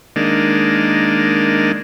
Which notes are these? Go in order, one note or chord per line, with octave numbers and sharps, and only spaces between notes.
D#3 G#3 A#3 D4